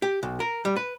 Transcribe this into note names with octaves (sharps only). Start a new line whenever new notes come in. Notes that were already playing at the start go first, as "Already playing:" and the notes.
G4
B1
A#4
G3
B4